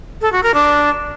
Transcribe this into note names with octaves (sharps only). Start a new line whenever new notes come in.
A4
F#4
A#4
D4